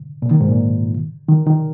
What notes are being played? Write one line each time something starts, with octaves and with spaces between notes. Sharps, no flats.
A#2
D#3
G#2
A#2
D#3
D#3